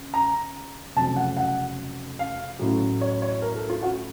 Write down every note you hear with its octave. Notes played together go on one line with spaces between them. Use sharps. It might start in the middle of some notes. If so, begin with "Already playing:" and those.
Already playing: C#3
A#5
F1 F2 C#3 F#3 A5
F#5
F#5
F5
A1 A2 F#3
C#5
C#5
A#4
A4
F4
F#4